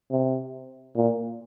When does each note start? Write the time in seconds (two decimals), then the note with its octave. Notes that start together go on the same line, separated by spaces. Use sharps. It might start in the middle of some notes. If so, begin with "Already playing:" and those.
0.11 C3
0.96 A#2